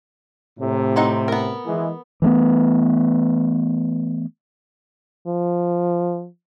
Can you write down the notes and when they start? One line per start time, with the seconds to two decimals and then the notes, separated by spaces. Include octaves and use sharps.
0.59 A2 C3
0.96 C4 D#4 F#5
1.28 B3 A#4
1.66 E3 G#3
2.22 E3 A3 B3
5.27 F3